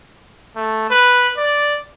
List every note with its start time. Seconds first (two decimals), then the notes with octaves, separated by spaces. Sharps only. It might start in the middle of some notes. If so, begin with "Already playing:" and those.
0.56 A3
0.90 B4
1.37 D5